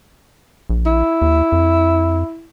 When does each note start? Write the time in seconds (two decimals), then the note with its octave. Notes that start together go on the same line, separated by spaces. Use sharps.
0.70 A#1
0.86 E4
1.22 D#2
1.52 F2